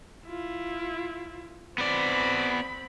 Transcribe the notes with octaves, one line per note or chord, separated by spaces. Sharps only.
E4 F4
B3 C4 D5 B5